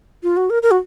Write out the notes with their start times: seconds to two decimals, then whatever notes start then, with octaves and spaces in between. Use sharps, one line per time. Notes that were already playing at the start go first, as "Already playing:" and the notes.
0.23 F4
0.37 F#4
0.50 A#4
0.63 A#4
0.71 F#4